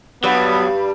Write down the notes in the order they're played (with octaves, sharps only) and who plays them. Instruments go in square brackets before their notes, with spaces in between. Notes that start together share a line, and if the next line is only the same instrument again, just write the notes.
[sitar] G2 G3 [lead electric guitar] F#3 [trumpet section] B3